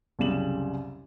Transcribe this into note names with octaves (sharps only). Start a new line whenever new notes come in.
C2 F#2 C#3 G3 E7 F#7